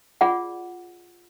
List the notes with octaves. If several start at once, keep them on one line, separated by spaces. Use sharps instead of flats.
F4 G#4 D5 F#5